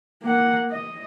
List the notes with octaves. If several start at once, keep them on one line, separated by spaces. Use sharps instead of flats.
A#3 F#5
D#5